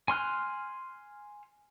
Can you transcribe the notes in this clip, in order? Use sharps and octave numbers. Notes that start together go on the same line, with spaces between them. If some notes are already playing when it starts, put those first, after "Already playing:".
G#5 C6 F6 F#6